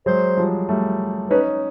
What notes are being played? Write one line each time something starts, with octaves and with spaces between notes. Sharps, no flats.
F#3 G#3 C5
F3 G3
G3 A3
C#4 D#4 B4